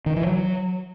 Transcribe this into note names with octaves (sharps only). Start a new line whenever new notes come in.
D#3
E3
F#3